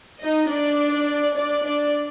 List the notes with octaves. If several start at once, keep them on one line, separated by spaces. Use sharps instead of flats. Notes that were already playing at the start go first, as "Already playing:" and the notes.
D#4 D#5
D4 D5
D4 D5
D4 D5